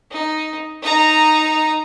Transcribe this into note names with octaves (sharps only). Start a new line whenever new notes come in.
D#4
D#4 A#5